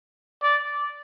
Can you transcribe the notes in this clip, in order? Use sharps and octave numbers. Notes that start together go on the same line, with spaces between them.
D5